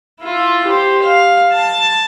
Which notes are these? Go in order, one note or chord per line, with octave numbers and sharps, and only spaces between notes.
E4 F4
G4 C5
F5
A5